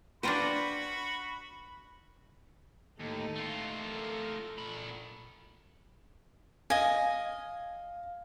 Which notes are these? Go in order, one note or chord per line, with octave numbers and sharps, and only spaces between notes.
D4 F4 F#4 B4 C5 G5 A#5 B5
D#2 A2 D#4 A4
A3 F4
A4 A#4
A#2 B5
D#5 F5 G#5